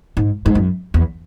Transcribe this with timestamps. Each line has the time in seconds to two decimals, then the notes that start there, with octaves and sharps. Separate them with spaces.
0.17 G#2
0.46 G#2
0.55 F#2
0.94 E2